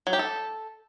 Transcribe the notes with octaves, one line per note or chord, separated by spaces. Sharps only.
F#3
G4
A4